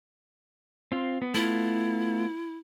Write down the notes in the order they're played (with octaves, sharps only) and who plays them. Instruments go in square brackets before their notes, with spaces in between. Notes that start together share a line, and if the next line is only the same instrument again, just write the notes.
[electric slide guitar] C4 F4
B3
[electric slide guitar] A3 B3 F4 [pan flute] E4